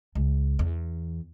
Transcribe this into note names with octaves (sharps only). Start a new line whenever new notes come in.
C#2
E2